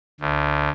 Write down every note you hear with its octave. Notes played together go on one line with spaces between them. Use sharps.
D2